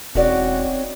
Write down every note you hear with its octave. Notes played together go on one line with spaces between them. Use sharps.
E1 C4 C#4 D#4 F#4 C#5 D5